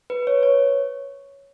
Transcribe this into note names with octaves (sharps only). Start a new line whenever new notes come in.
B4
C#5
C#5